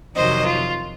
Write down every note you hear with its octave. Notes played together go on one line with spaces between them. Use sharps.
F2 C3 D#3 F#3 C5 D#5
F4